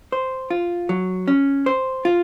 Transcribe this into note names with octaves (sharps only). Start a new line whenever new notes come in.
C5
F4
F#3
C#4
C5
F4